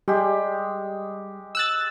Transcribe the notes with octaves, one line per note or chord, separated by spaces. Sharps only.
G3 G#3 G4
E6 F#6 A6